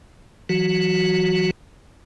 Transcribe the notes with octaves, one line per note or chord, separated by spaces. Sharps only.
E3 F#3 F#4